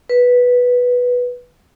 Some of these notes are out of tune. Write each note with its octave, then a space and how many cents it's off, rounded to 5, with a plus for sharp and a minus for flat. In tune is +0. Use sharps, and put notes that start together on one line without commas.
B4 -5